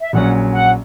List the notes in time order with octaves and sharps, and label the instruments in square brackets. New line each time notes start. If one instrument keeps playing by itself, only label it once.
[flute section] E5
[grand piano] A#1 A#2 F#3 C#4 [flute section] F#5
[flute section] F#5